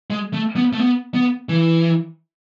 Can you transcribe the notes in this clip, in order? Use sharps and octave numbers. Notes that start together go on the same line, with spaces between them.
G#3
A3
B3
A3
B3
B3
E3